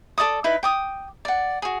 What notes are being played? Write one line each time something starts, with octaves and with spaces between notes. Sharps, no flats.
A4 D5 D6 D#6
D#4 E4 B4
G5 D6 D#6
D5 F#5
F#4 G#4